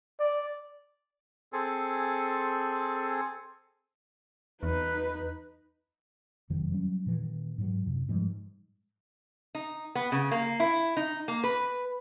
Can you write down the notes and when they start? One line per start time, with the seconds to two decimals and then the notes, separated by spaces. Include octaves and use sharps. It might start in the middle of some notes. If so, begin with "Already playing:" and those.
0.20 D5
1.53 C4 G#4 A4
4.63 E2 D#4 B4
6.50 F1 F#2 D#3 F#3
6.72 F#3 G3 C#4
7.06 A#2 D#3 E3
7.58 G#2 F#3
7.86 F#2 C3
8.09 G#2 F3 G3 G#3
9.55 D#4
9.95 B3
10.12 C#3
10.31 A#3
10.60 E4
10.97 D#4
11.28 A#3
11.44 B4